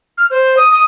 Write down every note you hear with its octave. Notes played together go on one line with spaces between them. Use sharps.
F6
C5
D#6
D#6